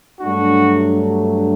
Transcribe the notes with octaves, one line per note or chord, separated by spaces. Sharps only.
G2 F#3 A3 D4 F#4